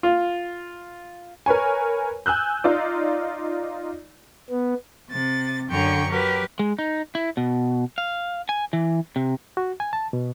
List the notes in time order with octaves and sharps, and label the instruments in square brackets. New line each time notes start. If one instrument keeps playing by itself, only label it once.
[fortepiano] F4
[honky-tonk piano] A#4 B4 C#5 G#5
G#5 E6 F#6 G6
D#4 F4 D5
[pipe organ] B3
[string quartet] C3 A6
F#2 D3 C#5 G5 A#5 C#6
F#3 G4 A#4 B4
[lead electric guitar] G#3
D#4
E4
B2
F5
G#5
E3
C3
[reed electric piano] F#4
G#5
A5
B2